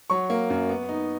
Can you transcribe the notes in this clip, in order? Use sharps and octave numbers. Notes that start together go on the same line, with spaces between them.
F#3 C#6
A#3
F#2
B3
D#4